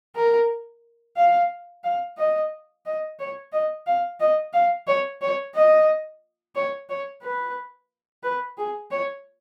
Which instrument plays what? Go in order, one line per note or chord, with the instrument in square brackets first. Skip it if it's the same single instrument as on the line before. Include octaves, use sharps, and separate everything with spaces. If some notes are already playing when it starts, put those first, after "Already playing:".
[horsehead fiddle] A#4
F5
F5
D#5
D#5
C#5
D#5
F5
D#5
F5
C#5
C#5
D#5
C#5
C#5
B4
B4
G#4
C#5